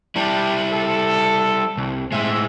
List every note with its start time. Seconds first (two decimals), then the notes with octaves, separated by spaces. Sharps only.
0.16 G3 D4 E4 G4 A5
0.72 A4
1.77 C2
2.12 A2 G#3 C4 E5